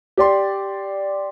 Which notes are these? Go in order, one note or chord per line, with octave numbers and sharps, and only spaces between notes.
G4 D5 C6